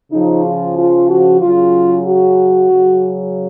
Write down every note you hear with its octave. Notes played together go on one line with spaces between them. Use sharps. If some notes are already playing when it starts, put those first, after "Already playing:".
C#3 F3 D#4
F4
F4
F#4
C#3 F#3 F4
F#4
C#3 F#3